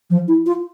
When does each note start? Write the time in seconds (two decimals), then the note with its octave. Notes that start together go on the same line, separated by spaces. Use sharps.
0.10 F3
0.28 E4
0.46 F4